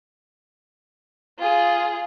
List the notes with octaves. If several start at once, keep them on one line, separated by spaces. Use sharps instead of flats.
F4 G#4